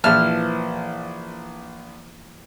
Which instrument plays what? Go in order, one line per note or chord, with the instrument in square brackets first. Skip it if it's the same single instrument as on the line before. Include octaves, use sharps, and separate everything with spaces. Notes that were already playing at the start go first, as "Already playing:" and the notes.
[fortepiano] A#1 A5 [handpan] E3 F3 A#3 [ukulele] E4 E5 [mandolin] F6